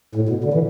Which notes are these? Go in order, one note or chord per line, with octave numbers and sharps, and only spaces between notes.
A2
B2
D3
E3